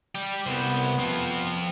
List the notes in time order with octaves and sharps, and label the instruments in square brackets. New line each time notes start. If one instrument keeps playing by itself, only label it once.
[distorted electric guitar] G3 G4
[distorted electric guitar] C2 C5 [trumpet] B3
[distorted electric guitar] F3 C4